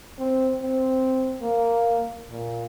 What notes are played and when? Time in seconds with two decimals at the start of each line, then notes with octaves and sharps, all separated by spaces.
0.19 C4
0.62 C4
1.42 A#3
2.31 A#2